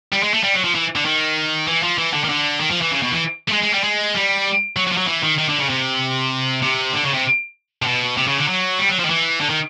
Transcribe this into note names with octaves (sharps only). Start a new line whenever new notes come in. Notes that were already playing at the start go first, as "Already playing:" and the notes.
G3
G#3
A3
G3
F#3
F3
E3
D3
D#3
E3
F3
E3
D3
D#3
D3
D#3
F3
E3
C#3
B2
E3
A3
G#3
G#3
G3
G#3
G3
F#3
F#3
F3
F#3
E3
D#3
D#3
D3
C#3
C3
C3
D3
C#3
C3
C3
B2
C3
C#3
D3
F#3
G3
F#3
F3
D#3
E3
D3
D#3